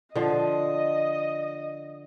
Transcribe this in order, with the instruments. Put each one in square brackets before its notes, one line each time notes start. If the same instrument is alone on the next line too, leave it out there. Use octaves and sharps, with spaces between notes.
[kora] D3 F3 [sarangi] D#5